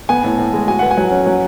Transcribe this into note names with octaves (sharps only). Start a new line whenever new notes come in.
B3 G#5
A2
A2
G#3
F#4 G#5
B4 F#5
G#5
F#3
C#4
F#3